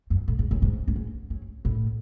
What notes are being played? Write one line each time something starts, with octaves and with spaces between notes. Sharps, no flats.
F#2
A2
G#2
F#2
G#2
F#2
G#2
F#2
A2